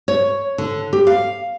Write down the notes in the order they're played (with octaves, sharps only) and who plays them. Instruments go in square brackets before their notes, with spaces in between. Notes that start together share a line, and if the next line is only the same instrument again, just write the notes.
[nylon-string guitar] C#5
D3
G4
F5